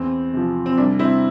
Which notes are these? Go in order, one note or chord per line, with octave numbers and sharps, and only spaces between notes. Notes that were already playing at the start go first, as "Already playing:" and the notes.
Already playing: E2 C4
C3 F3
C4
C2 D4
C4 E4